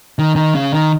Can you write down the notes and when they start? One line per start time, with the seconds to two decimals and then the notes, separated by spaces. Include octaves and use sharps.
0.19 D#3
0.36 D#3
0.55 C#3
0.74 D#3